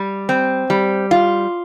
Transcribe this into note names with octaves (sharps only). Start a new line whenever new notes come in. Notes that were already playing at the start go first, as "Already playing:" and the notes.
Already playing: G3
C4
G3
F4